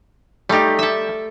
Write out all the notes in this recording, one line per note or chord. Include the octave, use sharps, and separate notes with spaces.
G3 A3 D#4 G4
A4 E5